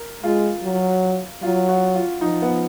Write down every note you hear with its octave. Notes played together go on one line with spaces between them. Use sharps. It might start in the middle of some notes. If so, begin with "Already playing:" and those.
Already playing: A#4
G#3 F4
F#3
F#3 F4
F#4
F4
F3 D#4
B3